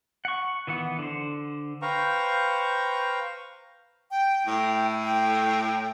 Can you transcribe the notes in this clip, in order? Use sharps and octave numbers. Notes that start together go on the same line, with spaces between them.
F#5 C#6
D#3 E3 B3 F#5
D3 C5
B4 C5 F5 G5 A#5 C#6
G5
A2 G5
G5